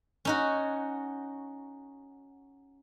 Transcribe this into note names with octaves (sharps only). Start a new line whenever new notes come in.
C#4 D#4 F#4